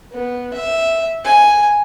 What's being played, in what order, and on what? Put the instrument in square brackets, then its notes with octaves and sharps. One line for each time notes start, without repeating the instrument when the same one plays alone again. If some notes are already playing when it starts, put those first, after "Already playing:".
[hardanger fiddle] B3
E5
G#5